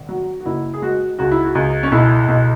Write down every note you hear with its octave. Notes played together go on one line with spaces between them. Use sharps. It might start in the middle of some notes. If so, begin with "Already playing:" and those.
Already playing: G#1
F#3
F#4
F#1 E4
G#4
G#3 F#4
C#2 F#4
E4
F#4
C#2
C#4
B1 E4
B1